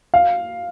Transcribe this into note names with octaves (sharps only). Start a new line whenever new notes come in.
F5